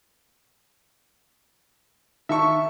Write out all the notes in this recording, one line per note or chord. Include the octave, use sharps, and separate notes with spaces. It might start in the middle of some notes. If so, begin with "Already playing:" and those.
D#3 E5 A5 C#6 C#7